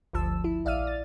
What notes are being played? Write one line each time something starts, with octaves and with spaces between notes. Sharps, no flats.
G1 D2 F3 A5 E6
E4
A#1 D5 E5 F5 F6 D#7
A6